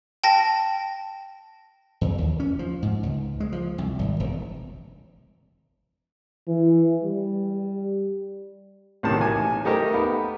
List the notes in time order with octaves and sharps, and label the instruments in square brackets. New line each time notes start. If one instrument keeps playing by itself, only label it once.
[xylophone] G5 A5 A#6
[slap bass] E2
D#2
C#4
F3
G#2
C#2
G#3
F3
C2
G#1
E1
[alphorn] E3
G3
[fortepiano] B1 A2 C3 D#3 A5
A1 G#5
A3 D#4 G4 A#4
B3